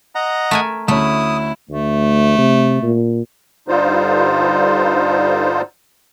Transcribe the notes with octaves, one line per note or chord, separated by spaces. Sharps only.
D#5 F#5 A#5
A3 A#4 G#5
D2 A3 C#4 E4 D#6
D2 A3
C3
A#2
G2 D3 G3 D#4 F4 C5